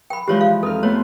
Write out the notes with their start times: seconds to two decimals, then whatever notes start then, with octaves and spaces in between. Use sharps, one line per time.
0.10 G5 B5
0.28 E3 F3 G#3 G4 C#5 D5
0.41 F5
0.63 F2 D#4 A4 F6
0.83 A3 B3 C#5 C6